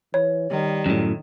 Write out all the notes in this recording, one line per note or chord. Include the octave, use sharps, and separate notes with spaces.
E3 C#5
D#3 G3
F#2 A2